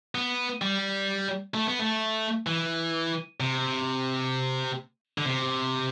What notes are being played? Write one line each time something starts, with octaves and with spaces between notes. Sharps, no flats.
B3
G3
A3
B3
A3
E3
C3
D3
C3